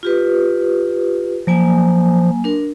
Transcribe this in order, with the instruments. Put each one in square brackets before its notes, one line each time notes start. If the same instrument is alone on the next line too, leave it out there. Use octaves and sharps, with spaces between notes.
[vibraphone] F4 G4 B4
[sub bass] F3 [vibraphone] F#3 A#3 G#5
[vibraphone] D4 A#4